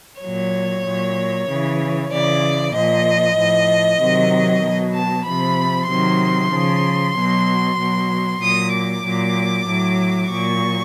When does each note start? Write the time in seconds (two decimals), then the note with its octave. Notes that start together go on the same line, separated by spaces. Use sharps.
0.22 A#2 F#3 C#5
0.85 A#2 F#3
1.48 C#3 E3
2.11 C#3 E3 D5
2.74 A#2 F3 D#5
3.37 A2 F3
4.00 C3 D#3 F#3
4.63 B2 F#3
4.94 A5
5.26 C3 F3 B5
5.89 C3 D#3 F#3 C6
6.52 C#3 F3
7.15 B2 F#3
7.78 B2 F#3
8.41 A#2 F#3 D#6
8.73 D6
9.04 A#2 F#3
9.67 A2 F#3
10.29 A#2 F#3 C#6